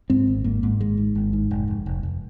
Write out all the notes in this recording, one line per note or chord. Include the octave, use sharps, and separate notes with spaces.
G#2 C4
G#1
G#2 A#3
G#2
G#1 G#3
G#2
G#1
G#2
F1
F1
F1
F1